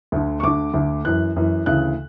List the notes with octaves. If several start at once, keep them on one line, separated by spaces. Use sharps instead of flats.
D2 D3
C#6
D2 D3 D6
D2 D3
F#2 E3 F#6
F#2 E3
D2 C#3 E3 F#6